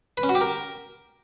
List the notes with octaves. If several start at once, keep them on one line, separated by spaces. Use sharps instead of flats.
B4
C#4
F#4
G4
A#4